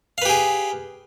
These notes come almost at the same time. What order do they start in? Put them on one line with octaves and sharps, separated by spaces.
F5 B4 G4 G#4